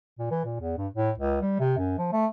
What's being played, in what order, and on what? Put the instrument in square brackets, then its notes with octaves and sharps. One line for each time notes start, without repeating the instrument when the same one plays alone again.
[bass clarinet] A#2
E3
A#2
E2
G2
A2
C#2
G3
C3
F#2
F3
A3